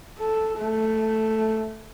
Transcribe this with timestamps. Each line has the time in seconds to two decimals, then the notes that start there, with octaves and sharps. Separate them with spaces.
0.19 A4
0.59 A3